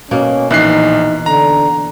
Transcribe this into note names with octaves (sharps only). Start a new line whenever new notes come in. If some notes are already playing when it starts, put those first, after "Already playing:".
B2 A#3 C#4
A#1 E3 D#4 F#6 C7
D3 A#5